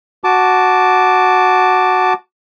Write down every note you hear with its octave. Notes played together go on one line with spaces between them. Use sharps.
F#4 A5 D6